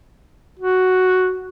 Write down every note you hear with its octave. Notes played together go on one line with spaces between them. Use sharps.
F#4